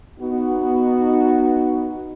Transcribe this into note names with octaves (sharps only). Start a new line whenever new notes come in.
B3 D#4 F#4